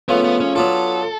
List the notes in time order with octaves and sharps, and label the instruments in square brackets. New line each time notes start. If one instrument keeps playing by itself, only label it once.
[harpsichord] C#3 F3 A3 [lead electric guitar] B3
[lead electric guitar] B3
C#4
[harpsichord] F#3 B3 D4 F4 [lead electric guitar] A4